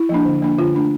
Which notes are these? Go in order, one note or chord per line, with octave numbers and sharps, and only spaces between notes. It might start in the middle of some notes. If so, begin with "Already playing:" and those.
Already playing: E4
F3 A#3 D4
D3
F3 A#3 D4
D3 F4
A3 D4